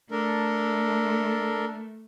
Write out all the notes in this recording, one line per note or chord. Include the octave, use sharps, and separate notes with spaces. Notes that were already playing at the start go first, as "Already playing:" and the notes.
A3 D4 A4 A#4